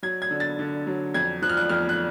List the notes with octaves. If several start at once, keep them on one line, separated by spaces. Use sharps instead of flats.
F#3 G#6
G#6
D3
A6
D3
F#3
F2 G#6
F3 F#6
F6
F#6
F2 F6
F#6